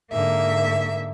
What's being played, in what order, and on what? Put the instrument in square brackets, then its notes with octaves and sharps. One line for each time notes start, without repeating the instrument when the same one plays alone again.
[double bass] G#2 D3 [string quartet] A#3 E5